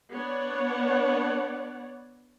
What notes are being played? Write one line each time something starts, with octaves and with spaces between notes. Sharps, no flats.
B3 D4 C#5 D5 F#5